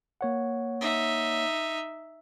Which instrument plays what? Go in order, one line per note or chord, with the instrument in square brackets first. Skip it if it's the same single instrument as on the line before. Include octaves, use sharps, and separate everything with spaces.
[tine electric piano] A#3 C#5 F#5
[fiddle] D#4 E5